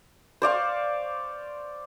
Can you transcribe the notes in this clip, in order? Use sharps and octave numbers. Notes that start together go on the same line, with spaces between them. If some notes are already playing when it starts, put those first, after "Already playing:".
C5 D5 F5 C#6